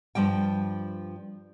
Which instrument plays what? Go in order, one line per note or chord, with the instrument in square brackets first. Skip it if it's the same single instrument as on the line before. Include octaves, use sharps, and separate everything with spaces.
[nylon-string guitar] G2 F3 G3 G5